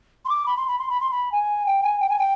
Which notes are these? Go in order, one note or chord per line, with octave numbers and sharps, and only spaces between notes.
C6
D6
B5
C6
B5
C6
B5
C6
B5
G#5
G5
G#5
G5
G#5
G5